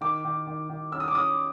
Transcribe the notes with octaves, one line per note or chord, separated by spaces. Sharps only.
D#3 D6
D#3
D#3
D#3
C#4 E6
D#6
D6
C#4 D#6